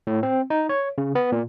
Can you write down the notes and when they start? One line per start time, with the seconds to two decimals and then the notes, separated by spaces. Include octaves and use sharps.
0.07 A2
0.23 C4
0.50 D#4
0.69 C#5
0.98 C#3
1.15 B3
1.32 A#2